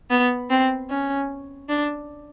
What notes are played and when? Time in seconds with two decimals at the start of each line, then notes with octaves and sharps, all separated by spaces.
0.11 B3
0.50 C4
0.90 C#4
1.69 D4